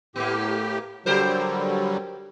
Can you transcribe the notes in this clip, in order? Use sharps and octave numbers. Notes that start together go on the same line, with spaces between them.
A2 A#3 B3 G4
D3 F#3 G3 G4 A#4 C5